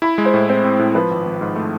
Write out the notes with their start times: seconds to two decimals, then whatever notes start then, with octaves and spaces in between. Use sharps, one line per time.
0.02 E4 B5
0.18 G#3
0.25 C5
0.34 A2
0.49 C4 C5
0.64 C4
0.79 A2
0.95 F3 B4
1.11 G#1
1.26 G#1
1.41 G#2
1.56 A3